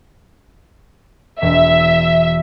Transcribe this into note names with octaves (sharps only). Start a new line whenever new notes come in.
E1 E5